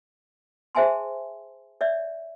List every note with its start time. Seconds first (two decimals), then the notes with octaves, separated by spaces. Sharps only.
0.75 G#4 C5 E5 G#5 A5 C6
1.81 C#5 D5 E5